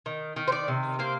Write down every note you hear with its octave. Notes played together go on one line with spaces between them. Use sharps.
D#3
D#3
C5
D5
C3
A#3 C5